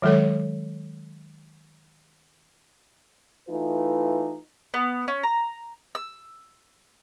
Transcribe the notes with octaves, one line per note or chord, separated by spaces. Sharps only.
D#3 F#3 G#3 A4 C#5
E3 A3 D#4 F4 B4
B3
C#4
A#5
E6